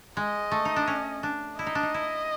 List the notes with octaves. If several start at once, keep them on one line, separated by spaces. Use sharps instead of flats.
G#3 D#5
A3
D#4
D4
C#4
D4
E4 D#5
D#4
D4
D#4
E4